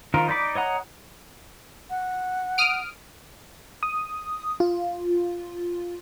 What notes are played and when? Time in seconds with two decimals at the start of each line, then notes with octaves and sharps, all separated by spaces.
0.14 D#3 F3 D#4 F4 A#4
0.28 D#4 D5 B5 D6
0.55 C#5 D#5 F#5 A#5
1.90 F#5
2.58 D#6 F6 D7
3.83 D#6
4.60 F4